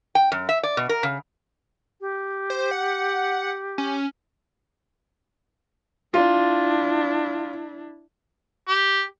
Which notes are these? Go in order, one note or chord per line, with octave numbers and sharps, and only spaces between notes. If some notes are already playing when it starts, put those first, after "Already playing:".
G5
F#2
E5
D5
B2
A#4
C#3
G4
C5
F#5
C#4
D4 E4 F4
G4